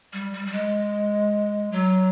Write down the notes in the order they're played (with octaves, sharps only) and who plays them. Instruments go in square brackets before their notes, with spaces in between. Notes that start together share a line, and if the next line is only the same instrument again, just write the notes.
[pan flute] G3
G3
G3
G#3
F#3